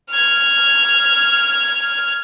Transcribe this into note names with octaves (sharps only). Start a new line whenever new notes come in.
F6 G#6